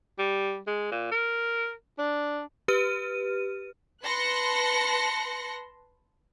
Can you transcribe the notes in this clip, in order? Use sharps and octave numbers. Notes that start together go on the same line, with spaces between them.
G3
G#3
A#2
A#4
D4
G4 B4 F6 D#7
B4 A5 C6 F#6 A#6 C#7